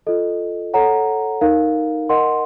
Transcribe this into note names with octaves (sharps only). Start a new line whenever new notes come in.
F4 A4 D#5
A4 C#5 F#5 A#5
D#4 A#4 F5
A#4 D#5 F#5 C6